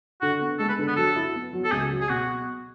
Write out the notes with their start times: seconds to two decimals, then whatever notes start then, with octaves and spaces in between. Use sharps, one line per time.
0.21 D3 F#4
0.40 B3
0.59 G#3 A4
0.68 B4
0.78 D3
0.88 B3
0.96 F#3 A4
1.16 E4
1.34 B3
1.53 F#3
1.64 A4
1.72 C#2 G#4
1.90 F#3
2.01 G#4
2.09 B2 F#4